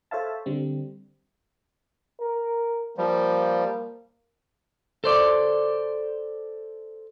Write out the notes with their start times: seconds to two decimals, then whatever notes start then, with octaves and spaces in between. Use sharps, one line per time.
0.11 A4 C5 C#5 E5 F5 A5
0.46 D3 G3 C4
2.19 A#4
2.97 F3 G3 A#3
5.04 A4 C5 D5